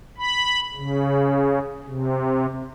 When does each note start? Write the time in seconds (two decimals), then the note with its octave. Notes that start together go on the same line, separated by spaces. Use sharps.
0.18 B5
0.74 C#3
1.87 C3